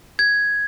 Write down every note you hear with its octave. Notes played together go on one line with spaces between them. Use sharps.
G#6